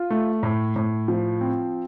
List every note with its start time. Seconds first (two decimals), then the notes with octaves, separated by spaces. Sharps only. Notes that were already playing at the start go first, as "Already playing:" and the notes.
Already playing: F4
0.10 A3
0.43 A2
0.76 A2
1.08 F3
1.41 C4